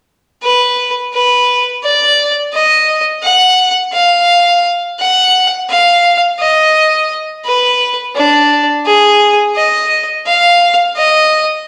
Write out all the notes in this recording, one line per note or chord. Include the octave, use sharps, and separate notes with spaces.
B4
B4
D5
D#5
F#5
F5
F#5
F5
D#5
B4
D4
G#4
D#5
F5
D#5